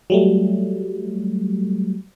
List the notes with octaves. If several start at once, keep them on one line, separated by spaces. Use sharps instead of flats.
F#3 G3 A3